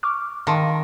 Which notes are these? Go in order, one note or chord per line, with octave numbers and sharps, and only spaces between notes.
C#6 D6 F6
D#3 F5 A5 C6